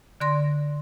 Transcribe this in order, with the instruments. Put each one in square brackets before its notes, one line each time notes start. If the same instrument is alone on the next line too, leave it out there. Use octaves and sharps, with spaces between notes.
[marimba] D3 D5 C6 A#6